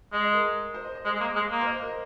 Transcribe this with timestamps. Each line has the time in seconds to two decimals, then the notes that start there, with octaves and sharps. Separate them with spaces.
0.13 G#3 D#5
0.23 D#5
0.33 A#4
0.74 C5
0.84 D#5
0.95 D#5
1.05 G#3 D#5
1.16 G#3
1.20 A#3
1.35 G#3
1.51 A#3
1.61 C5
1.67 D#5
1.82 A#4